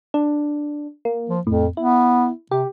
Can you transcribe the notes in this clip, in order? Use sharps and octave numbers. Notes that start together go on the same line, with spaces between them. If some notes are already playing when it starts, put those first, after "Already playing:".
D4
A#3
F3
F2 A2
B3 E4
C3 G4